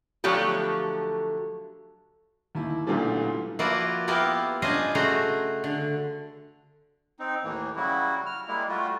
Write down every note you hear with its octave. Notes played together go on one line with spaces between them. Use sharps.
D3 F3 F#3 A3 G4 A4
D#2 E4
B1 A#2 D3 E3 G3 A3
F3 A#3 E4 F#4 B4 D5
A#3 B3 E4 F4 G4 A#4
C#4 D4 F4 C5 D#5 G#5
C#3 A3 F#4 C5 A#5
D3
C4 D#4
D#2 A2 E3 A#3
C#3 F#3 G3 E4 F#4
F6
G3 G#3 A#3 E4
G3 A3 F4 F#4